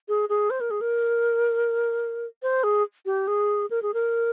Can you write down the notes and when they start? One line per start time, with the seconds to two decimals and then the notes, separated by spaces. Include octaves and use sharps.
0.08 G#4
0.29 G#4
0.50 C5
0.60 A#4
0.71 G#4
0.81 A#4
2.43 C5
2.63 G#4
3.06 G4
3.27 G#4
3.70 A#4
3.82 G#4
3.94 A#4